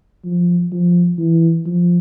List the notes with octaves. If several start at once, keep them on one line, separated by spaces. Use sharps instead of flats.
F3
F3
E3
F3